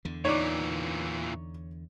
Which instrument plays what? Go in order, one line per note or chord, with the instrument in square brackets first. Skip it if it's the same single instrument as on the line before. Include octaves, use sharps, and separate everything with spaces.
[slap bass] E2 D3
[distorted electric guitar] A#2 E3 [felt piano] D#4 D5 [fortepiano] C#5 D6